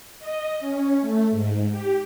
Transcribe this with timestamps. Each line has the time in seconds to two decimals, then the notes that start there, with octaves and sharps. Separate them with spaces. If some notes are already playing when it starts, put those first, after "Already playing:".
0.20 D#5
0.60 C#4
1.01 A3
1.31 G#2
1.71 G4